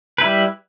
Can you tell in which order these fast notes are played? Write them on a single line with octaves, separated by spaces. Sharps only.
B4 E4 G3